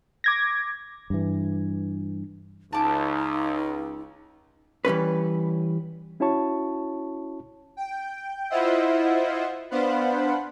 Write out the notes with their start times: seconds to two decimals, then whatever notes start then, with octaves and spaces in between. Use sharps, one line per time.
0.24 D6 G#6 A#6
1.10 G2 E3
2.73 C#2 D#4 A5 D6
4.85 E3 G3 C#4 B4
6.20 C#4 E4 F#4 C#5 A5 C#6
7.77 G5
8.50 E4 F4 C5 D#5 E5 F#5
9.71 B3 D4 C5 F5 F#5 B5